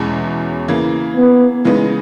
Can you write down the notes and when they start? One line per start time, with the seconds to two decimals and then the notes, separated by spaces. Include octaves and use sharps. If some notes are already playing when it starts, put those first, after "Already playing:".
Already playing: E2 B2 G#3 C#4 E4
0.68 C#3 E3 A#3
1.16 B3
1.65 C#3 E3 G#3 B3 D#4